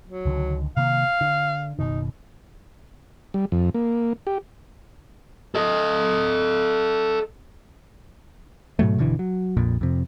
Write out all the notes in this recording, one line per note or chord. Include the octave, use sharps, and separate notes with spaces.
F#3
C#2 D3 D#3
C3 D#3 A#3 F5
D3
F#1 B2 D#3 D#4
G3
F2
A#3
G4
A4 D#5
G#2 B2 F#3 A3
F#1 B2 D3 E3
F#3
A#1 F2 A#2
F2 C3